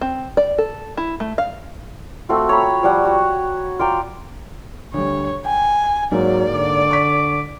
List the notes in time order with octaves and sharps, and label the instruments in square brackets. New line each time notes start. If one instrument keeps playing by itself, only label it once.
[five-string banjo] C4
D5
A4
E4
A3
F5
[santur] A3 C4 F4 F#4
C#5 A#5 B5
F3 G3 F#5
F#4
F4 D5 G5 A#5
[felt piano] D2 G3 [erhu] C#5
[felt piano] G5 [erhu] G#5
[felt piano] G#2 A#3 [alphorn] F#3 [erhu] D5
[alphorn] D3 [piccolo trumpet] D6
[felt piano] C#6 B6